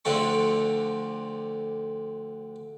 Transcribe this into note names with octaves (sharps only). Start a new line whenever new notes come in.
D2 D3 F3 C4 A4 C#6